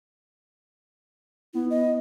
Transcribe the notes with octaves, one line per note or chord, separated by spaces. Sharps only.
B3 E4
D#5